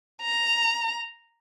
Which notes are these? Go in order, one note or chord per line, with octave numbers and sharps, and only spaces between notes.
A#5